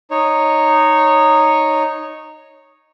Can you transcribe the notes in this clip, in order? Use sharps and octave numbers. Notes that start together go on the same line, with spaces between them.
D#4 C#5